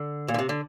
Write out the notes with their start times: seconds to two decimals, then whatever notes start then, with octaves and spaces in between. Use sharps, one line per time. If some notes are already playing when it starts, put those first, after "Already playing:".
Already playing: D3
0.28 A#2
0.34 D3
0.39 C3
0.49 D3